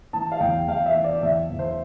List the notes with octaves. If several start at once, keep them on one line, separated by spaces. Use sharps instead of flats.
E3 A5
F5
E2 G5
E2 F5
E5
E3
D5
E2 E5
E2
C5